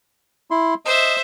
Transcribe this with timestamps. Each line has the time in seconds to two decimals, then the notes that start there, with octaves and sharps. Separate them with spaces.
0.51 E4 C6
0.85 C5 D#5 E5